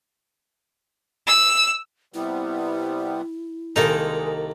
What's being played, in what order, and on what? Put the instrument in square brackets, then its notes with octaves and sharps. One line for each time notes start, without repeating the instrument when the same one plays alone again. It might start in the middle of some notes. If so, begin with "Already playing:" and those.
[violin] E6
[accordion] C3 G3 B3 [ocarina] E4
[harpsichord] C2 A4 A#5 [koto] D#3 A#3 D#4 [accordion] G#3